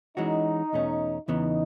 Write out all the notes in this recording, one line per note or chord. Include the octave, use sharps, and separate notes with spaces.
E3 G#3 C#4 D#4 F#4
E2 B2 A3 C#4
E2 C#3 E3 B3 D#4